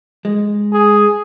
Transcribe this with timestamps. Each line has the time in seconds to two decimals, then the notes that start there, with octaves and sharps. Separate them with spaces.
0.25 G#3
0.72 G#4